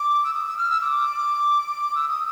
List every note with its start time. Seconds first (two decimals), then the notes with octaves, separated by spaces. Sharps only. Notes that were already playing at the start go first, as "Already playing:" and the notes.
Already playing: D6
0.24 E6
0.34 D#6
0.46 E6
0.58 F6
0.70 E6
0.81 D6
1.95 E6
2.08 D#6